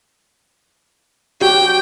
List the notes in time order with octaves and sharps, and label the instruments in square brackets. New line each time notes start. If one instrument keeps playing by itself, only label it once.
[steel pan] F#4 G4 [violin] G5